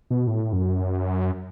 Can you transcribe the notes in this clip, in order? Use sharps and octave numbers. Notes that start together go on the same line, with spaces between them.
B2
A2
F#2